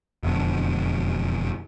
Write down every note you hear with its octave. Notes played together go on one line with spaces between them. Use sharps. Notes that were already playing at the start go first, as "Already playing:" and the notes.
E1 F2 B2 D3